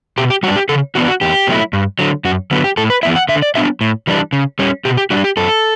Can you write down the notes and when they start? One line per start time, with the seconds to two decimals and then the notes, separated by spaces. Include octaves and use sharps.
0.18 B2 G4
0.30 G4
0.43 G3 F#4
0.47 D4
0.56 G4
0.69 C#3 A4
0.95 E3 B3 D4 F#4
1.08 F#4
1.21 E2 G4
1.47 B2 F#3 A3 E4
1.73 G2
1.99 D3 F#3
2.25 F#2 F#4
2.51 D3 F#3 B3
2.64 G4
2.77 A2 A4
2.90 B4
3.03 E3 B3 E4 E5
3.16 F#5
3.29 D3 E5
3.42 D5
3.55 F#3 B3 D4 E5
3.81 A2
4.07 E3 G3 D4
4.33 C#3
4.59 G3 C#4
4.85 B2 G4
4.97 G4
5.10 G3 D4 F#4
5.24 G4
5.37 F#2 A4